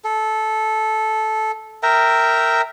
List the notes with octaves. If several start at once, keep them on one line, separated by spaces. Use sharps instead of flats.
A4
A#4 E5 G5 A#5